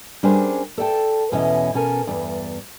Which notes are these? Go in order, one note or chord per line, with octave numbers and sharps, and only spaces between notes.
G3 C#4 D4 G#4 A#4 C5
A4 D5 G5 A5
E2 B2 E3 C#4 E4 D#5
B2 C#4 A4 A#4 G#5
E2 G2 D5